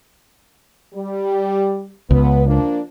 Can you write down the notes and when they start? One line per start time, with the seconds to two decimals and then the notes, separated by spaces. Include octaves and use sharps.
0.94 G3
2.11 C#2 B3
2.47 F3 A#3 D4